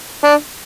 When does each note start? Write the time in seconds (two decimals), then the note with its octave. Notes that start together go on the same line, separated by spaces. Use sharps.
0.24 D4